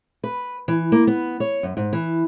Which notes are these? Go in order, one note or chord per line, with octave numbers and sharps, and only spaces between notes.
B4
E3
A#3
B3
C#5
F#2
G#2
E3